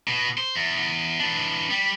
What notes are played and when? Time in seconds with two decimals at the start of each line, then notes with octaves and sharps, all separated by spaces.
0.08 B2
0.38 C5
0.56 E2
1.20 E3 D4
1.70 G3